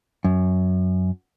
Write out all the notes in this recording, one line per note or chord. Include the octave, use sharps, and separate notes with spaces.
F#2